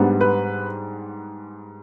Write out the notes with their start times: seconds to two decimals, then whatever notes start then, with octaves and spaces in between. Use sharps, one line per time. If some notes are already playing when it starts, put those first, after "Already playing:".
Already playing: G#2 G3 B3 D4
0.21 B4